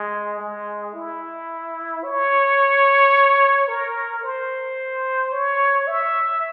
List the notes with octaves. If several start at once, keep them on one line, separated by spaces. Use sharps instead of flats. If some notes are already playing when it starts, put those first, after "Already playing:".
Already playing: G#3
G#3
E4
C#5
A#4
C5
C#5
E5